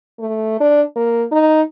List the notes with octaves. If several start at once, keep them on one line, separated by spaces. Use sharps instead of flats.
A3
D4
A#3
D#4